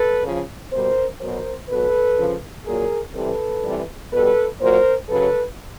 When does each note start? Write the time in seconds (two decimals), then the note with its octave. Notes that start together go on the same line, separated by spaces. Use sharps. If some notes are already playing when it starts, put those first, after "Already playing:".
Already playing: A4 B4
0.23 C#3 F3
0.72 B2 G3 A#4 C5
1.21 B2 F#3 A#4 C5
1.69 B2 F#3 A4 B4
2.18 C#3 F3
2.66 A#2 F#3 G#4 A#4
3.14 C3 E3 G3 A4 B4
3.63 C3 E3 G3
4.12 B2 G3 A4 B4
4.60 A#2 F#3 A#4 C5
5.09 C#3 F#3 A4 B4